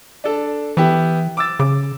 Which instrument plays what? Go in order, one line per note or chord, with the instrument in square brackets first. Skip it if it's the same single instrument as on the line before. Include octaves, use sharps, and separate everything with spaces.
[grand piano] D4 A4
[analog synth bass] E3 [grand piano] B3 E4 G4
[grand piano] D6 E6 A6
[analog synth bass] C#3 [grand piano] D6